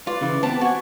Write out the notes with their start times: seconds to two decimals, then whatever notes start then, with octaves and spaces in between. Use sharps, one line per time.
0.07 F4 B4 D5
0.21 C#3 E3
0.43 B3 C4 A5 D6
0.61 F#4 G#5 C#6